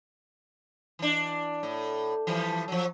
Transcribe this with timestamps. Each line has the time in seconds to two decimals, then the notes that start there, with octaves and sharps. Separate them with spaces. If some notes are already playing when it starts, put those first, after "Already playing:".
0.99 E3 D4
1.63 A2
2.27 E3 F3 G3
2.68 F3 F#3